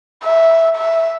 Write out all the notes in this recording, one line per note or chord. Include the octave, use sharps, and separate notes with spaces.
E5
E5